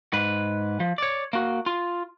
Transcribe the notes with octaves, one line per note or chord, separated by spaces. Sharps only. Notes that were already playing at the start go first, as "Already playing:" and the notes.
G#2 B4
F3
C#5 D5
A#3 F#4
F4